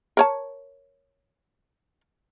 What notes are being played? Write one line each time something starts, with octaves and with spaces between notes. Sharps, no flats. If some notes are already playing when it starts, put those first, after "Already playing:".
A#4 C#5 A5